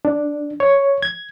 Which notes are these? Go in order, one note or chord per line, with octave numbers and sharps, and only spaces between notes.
D4
C#5
G#6